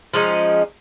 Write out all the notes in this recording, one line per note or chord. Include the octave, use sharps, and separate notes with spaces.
F3 G#3 C#4 D#4